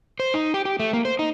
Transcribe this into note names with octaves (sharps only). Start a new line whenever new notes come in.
C5
D#4
G4
G4
A3
A#3
C5
D#4